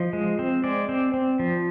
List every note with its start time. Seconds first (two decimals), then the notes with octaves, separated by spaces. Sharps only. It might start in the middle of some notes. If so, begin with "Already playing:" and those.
Already playing: F3 D#5
0.13 G#3
0.39 C4
0.64 G#3 D5
0.89 C4
1.14 C4
1.39 F3